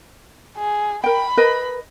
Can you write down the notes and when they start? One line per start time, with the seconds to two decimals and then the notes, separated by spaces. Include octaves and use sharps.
0.57 G#4
1.04 A#4 G5 B5
1.37 A#4 B4 D#5